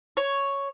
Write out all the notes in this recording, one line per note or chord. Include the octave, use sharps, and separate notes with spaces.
C#5